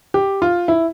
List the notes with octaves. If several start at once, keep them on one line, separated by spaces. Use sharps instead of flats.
G4
F4
E4